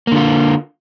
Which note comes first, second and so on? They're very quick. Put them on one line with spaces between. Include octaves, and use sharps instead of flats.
A#3 D3 F4